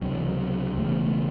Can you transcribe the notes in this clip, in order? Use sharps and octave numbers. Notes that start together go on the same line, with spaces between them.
C#2 C3 F#3
E3
F#3
E1 E2 C#3 A3
A3